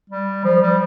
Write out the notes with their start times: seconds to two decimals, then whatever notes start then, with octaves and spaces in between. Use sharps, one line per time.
0.10 G3
0.45 F3
0.62 G3